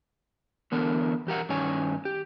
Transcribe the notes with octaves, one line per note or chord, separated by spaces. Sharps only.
D3 E3 B3 A#4
E2 G4 A#4 F#5
G2 D#3 C#4 C#5 G#5
G4